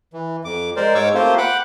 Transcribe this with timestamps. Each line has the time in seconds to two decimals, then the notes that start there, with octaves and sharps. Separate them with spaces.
0.13 E3
0.45 F2 D6
0.76 G#3 A#4 C5 D5
0.95 G#2 G#3 C#5 C#6 D6 E6
1.14 A3 A#3 C4 F4 G4 C5
1.38 F#5 G5 B5 D6 F#6